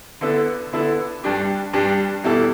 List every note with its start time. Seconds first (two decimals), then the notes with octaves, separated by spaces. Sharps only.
0.21 D3 B3 E4 A4
0.73 D3 B3 E4 A4
1.23 G2 G3 D4 G4
1.73 G2 G3 D4 G4
2.23 E2 B2 G3 E4 A4